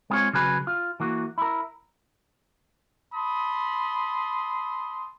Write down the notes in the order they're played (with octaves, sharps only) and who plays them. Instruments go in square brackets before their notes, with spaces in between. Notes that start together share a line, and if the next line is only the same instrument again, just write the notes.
[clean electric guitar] G#3 B3 C4 F4 G#4 C#5
C#3 F#3 G#4 B4
F4
E3 A#3 F#4
E4 A#4
[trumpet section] A5 B5 C6 D#6